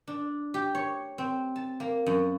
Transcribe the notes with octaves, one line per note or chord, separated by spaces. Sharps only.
D4
G4
C#5
C4
A5
A#3
F#2